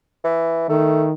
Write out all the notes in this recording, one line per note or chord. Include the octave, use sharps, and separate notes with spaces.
E3
D#3 A3